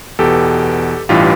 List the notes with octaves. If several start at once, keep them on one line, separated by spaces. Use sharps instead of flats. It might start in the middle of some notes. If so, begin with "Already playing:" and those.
E2 B2 G4 A4
A1 G2 E3 F4 G4